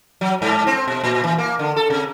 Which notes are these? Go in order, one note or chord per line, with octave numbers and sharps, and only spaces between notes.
F#3
G#2
C4
B2
A#2
E3
A#3
D3
A4
C3